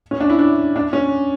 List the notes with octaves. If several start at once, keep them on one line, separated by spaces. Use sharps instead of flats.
C#4
D4
E4
D4
D4
C#4